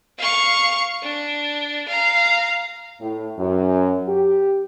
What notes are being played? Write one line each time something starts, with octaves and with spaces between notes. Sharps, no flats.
F5 C#6
D4
F5 A#5
A2
F#2
G4